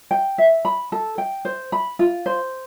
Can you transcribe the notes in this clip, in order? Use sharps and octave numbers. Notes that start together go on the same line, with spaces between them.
G5
E5
B5
A4
G5
C5
B5
F4
C5